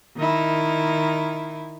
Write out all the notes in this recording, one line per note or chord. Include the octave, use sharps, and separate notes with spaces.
D#3 E4